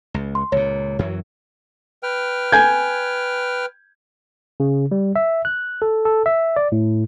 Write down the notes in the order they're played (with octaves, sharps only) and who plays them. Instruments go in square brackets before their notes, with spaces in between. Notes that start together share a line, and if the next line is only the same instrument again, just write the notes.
[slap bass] C#2
[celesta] C6
[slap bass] C#2 A#2 [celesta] C#5
[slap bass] F#2 E3 F#3
[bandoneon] B4 G5 F6
[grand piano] G#5 G6 G#6
[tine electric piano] C#3
G3
E5
F#6
A4
A4
E5
D5
A2